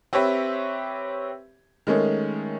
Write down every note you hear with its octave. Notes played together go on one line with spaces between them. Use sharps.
C4 G4 B4 C#5 E5
D#3 G#3 A3 C#4